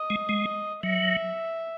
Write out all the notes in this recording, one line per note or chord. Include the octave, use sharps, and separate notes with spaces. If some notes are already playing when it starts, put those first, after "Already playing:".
Already playing: D#5
G#3
G#3
F#3 E5